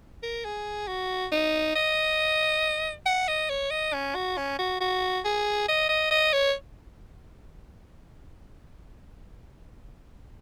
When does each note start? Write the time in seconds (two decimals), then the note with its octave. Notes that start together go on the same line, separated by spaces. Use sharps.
0.23 A#4
0.45 G#4
0.87 F#4
1.32 D#4
1.76 D#5
3.06 F#5
3.28 D#5
3.50 C#5
3.71 D#5
3.93 C#4
4.15 F#4
4.37 C#4
4.59 F#4
4.81 F#4
5.25 G#4
5.68 D#5
5.89 D#5
6.11 D#5
6.33 C#5